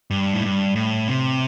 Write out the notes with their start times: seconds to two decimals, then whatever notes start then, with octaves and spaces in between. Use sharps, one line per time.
0.11 G2
0.34 A2
0.44 G2
0.76 A2
1.08 C3